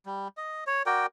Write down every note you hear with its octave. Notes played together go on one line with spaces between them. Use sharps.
G3
D#5
C#5
F#4 A#4 D5 G5